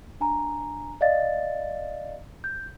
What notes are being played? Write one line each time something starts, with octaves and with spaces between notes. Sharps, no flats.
D4 G#5 A#5
D5 D#5 F5 A6
G6